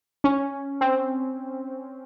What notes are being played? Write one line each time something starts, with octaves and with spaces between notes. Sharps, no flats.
C#4
C4